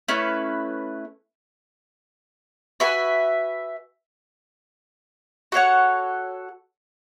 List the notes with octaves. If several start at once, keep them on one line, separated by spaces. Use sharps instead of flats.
A3 C#4 E4 B4
F#4 B4 E5 G#5
F#4 A4 C#5 F#5